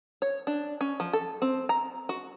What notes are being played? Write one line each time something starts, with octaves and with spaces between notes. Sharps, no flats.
C#5
D4
C#4
F3
A4
C4
A#5
F#4